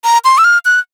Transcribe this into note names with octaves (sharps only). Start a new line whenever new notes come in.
A#5
C6
E6
F6
F#6